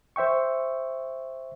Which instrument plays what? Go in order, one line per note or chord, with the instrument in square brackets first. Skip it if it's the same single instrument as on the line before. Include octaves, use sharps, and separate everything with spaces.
[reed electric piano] C5 E5 G5 C#6